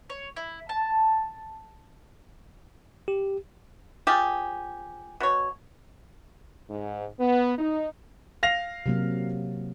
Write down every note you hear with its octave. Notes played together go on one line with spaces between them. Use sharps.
C#5
E4
A5
G4
F3 G4 G#4
B2 C#5
G#2
B3
D#4
F5 A#6 F7
C3 F#3 A#3